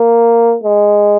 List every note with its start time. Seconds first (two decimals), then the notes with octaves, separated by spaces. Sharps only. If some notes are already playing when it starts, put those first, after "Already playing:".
Already playing: A#3
0.64 G#3